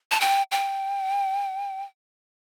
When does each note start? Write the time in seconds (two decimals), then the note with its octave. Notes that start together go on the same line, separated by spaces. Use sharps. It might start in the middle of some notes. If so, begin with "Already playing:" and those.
0.11 A5
0.21 G5
0.52 G5